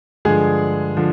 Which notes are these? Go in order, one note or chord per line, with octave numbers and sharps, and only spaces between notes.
G2 D3 F3 G#3 G#4
D3 F3